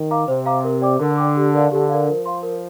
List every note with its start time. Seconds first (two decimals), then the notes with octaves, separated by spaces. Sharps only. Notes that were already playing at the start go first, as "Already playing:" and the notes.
Already playing: D#3
0.11 F5 A#5 D6
0.28 C3 C5
0.46 F5 A#5 D6
0.64 A#4
0.82 D5 G5 D6
1.00 D3 A#4
1.17 D5 G5 D6
1.36 G4
1.53 A#4 D5 F5
1.71 D3 G4
1.89 A#4 D5 F5
2.07 F3 A#4
2.26 F5 C6
2.43 A#4